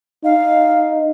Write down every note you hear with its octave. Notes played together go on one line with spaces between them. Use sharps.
D#4 F5